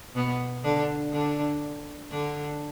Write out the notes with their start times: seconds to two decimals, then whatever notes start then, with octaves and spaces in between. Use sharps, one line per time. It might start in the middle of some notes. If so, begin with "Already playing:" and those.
0.15 B2 B3
0.64 D3 D4
1.13 D3 D4
2.11 D3 D4